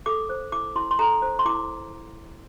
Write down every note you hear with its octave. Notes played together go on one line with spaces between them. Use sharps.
A4 D6
C5
E4 D6
E4 C6
C6
A4 A#5
C5
C6
E4 D6